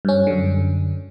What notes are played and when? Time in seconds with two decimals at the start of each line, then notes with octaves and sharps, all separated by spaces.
0.05 G2 C#4
0.27 F#2 D3